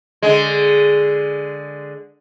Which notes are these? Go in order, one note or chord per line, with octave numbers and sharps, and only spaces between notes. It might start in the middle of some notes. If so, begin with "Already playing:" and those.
D3 G#3